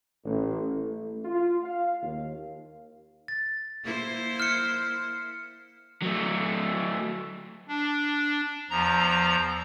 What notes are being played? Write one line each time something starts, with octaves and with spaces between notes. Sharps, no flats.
A1
A3
F4
F5
D#2
A6
A#3 E4 C5
F6 C#7
F#3 A3
D4
E2 F3 A#5